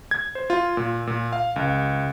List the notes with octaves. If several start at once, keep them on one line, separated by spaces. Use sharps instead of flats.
G#6
C5
F4
A#2
A#2
F5
C#2